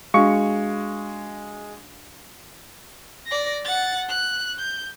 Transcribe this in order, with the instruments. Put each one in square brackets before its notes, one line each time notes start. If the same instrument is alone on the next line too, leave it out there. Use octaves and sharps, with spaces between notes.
[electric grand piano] G#3 C#6 C#7 [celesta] D4 F#4 F5
[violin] D5 A#6
F#5 A6
F#6
G6